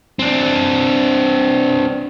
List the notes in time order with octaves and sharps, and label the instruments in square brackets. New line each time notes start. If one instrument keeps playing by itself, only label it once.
[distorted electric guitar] C4 D4